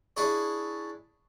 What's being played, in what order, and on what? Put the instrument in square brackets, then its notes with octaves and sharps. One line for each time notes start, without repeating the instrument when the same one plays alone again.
[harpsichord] D4 E4 G#4 C#5